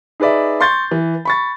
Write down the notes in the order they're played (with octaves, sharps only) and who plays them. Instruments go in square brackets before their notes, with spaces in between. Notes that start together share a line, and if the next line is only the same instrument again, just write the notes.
[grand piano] D#4 G#4 B4 D5 E5
C6 C#6 G6 A6
E3
B5 C#6 A6